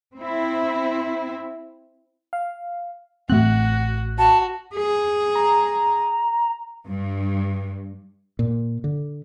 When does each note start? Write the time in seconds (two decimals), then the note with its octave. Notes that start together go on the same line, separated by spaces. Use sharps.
0.17 C4 E4
2.33 F5
3.30 A1 A3 C4 F#4 F#6
4.18 F#4 A5
4.75 G#4
5.35 A#5
6.87 G2
8.39 A#2
8.84 D3